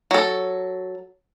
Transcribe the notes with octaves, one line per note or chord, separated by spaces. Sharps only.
F#3 A4